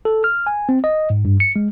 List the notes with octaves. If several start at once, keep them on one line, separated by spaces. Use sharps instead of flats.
A4
F6
G#5
C4
D#5
G#2
G2
C#7
G#3